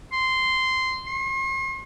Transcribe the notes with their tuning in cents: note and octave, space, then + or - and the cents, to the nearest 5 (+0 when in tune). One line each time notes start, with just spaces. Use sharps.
C6 -10
C6 +45